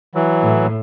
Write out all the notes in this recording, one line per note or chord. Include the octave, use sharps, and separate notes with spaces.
E3 F#3
A2